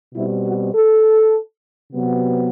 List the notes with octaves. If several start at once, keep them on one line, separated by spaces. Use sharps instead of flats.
B2 G3 C4 E4
F#4
A4
C3 F#3 B3